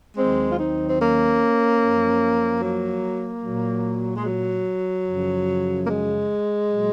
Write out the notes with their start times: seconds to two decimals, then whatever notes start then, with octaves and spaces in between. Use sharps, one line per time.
0.17 D#2 D#3 F#3 G#3 C4
0.50 F4
0.58 C4 D#4
0.87 C4
0.99 A#3 C#4
1.80 F#2 F3
2.61 F#3 A#3
3.43 A#2 F#3
4.16 G#3
4.25 F#3
5.06 F#2 C#3 F3
5.83 A#3
5.87 G#3
6.69 A#2 F#3